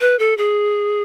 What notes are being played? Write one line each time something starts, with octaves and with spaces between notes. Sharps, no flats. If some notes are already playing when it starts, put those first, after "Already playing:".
B4
A4
G#4